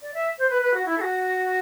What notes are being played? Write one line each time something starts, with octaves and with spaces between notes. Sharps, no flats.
D5
E5
C5
B4
B4
F#4
E4
A4
F#4